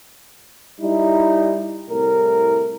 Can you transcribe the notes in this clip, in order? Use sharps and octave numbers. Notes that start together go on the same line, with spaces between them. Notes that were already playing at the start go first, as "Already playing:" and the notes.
G3 D#4 E4
C2 A2 A#4